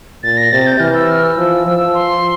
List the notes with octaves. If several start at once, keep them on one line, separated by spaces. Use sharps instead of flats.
A#2 A6
A#6
C3 A6
G6
E3 F6
E6
F6
E6
F3
F3
C6